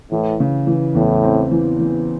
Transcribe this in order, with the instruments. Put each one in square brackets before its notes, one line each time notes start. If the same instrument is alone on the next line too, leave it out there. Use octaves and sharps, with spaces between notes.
[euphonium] A2 [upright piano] E3
[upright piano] C#3
E3
[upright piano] E2 [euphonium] A2
[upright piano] C4
E3
E3